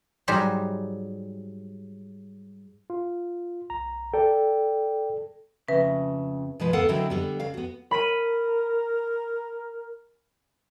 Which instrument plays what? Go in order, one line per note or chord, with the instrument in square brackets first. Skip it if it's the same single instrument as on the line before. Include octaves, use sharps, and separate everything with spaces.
[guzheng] G#2 F#3 G3 G4 C5 D#5
[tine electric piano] F4
B1 A#5
[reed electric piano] A4 [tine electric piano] D5 G5
[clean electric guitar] F2 C#3 [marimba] B4 [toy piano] E5
[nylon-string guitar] B2 F3 G#3 B4
D2 B3 A4 A#4 F5 F#5
D3 F#3 G#3 C4 E4
D3 G3 B3
C#3 F5
B3 F#4
[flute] A#4 [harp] B5 B6 D#7